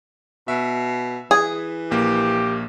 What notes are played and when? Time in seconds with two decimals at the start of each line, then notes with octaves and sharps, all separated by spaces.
0.48 B2 E5
1.31 E3 G#4
1.91 A#1 A#3 G4